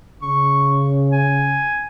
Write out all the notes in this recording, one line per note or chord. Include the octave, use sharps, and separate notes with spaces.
C#3 C#6
G#5